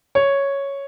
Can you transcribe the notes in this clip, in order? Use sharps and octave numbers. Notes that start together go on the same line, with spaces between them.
C#5